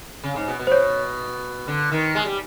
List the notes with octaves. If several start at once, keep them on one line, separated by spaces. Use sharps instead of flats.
C#3
G#2
B2
B2
C5
C#5
D3
D#3
G#3
G3